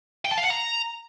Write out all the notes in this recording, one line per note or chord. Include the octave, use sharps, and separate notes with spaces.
G5
A5
F5
F#5
A#5